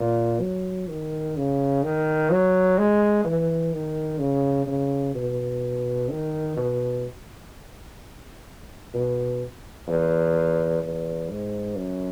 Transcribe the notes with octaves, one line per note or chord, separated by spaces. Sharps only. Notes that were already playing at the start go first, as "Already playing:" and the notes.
Already playing: A#2
F#3
D#3
C#3
D#3
F#3
G#3
E3
D#3
C#3
C#3
B2
D#3
B2
B2
E2
E2
G#2
F#2